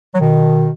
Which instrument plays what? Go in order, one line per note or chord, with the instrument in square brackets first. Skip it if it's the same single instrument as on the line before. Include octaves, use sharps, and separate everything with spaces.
[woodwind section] F#3
B2 D#3